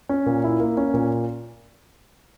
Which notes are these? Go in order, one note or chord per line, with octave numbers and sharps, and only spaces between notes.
C#4
A#2
E4
A#3
C#4
A#2